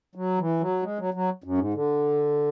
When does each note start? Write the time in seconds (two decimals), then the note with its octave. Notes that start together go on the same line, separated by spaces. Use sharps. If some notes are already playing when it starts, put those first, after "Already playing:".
0.15 F#3
0.38 E3
0.60 F#3
0.83 G#3
0.99 F#3
1.14 F#3
1.44 F#2
1.58 G#2
1.74 D3